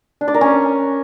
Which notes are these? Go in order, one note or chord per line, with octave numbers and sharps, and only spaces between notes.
D4
D5
A#4
C#4